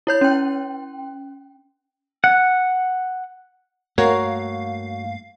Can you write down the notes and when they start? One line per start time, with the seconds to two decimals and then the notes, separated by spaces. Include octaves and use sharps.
0.07 E4 C#5 G6
0.21 C#4 G5
2.24 F#5
3.98 G2 A3 A#3 F#4 A#4 C#5 F5